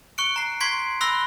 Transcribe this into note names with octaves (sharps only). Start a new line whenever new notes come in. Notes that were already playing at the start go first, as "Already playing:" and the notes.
C#6 F#6 C#7 D7
A#5 C7
C6 C#6 G#6 B6 C7 D7
B5 C6 E6 F#6 A#6 G7